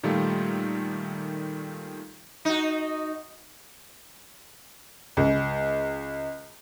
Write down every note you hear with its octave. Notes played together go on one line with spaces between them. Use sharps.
A#2 D#3 G3 A3 F4
D#4 F#4
C#2